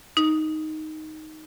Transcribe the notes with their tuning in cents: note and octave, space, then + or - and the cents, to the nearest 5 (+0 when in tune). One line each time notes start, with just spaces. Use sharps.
D#4 +5